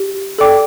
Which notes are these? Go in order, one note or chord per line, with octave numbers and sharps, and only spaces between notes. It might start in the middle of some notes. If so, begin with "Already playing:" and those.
Already playing: G4
A4 D5 G5 D6